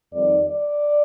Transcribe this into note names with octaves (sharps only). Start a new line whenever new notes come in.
F2 D#3 G3 D5
D5